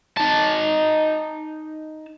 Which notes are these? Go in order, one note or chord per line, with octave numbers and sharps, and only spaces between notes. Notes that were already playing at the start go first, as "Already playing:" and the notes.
D#4 A5